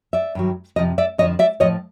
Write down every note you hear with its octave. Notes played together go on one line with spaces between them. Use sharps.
D5 E5
G2 D#3 F#3
F2 C3 F3 D#5
D5 E5
F2 D3 F3 C#5 D#5
D5 E5
A2 F3 C#5 D#5